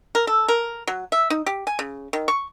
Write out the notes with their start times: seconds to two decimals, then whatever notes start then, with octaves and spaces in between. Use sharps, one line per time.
0.15 A#4
0.27 A4
0.48 A#4
0.87 F#3
1.12 E5
1.30 D#4
1.46 G4
1.67 G#5
1.79 C#3
2.13 D#3
2.28 C#6